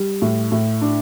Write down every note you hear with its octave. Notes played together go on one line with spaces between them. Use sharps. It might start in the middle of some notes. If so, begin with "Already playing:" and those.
Already playing: G3
A2
A2
D4